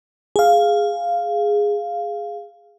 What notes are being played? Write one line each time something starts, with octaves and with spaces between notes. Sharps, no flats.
G#4 F5